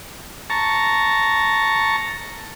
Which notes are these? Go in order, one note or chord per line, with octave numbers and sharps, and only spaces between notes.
A5 A#5 C#6